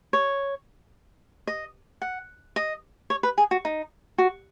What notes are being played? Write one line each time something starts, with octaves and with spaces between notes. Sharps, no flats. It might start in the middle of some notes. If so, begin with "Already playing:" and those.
C#5
D#5
F#5
D#5
C#5
B4
G#4
F#4
D#4
F#4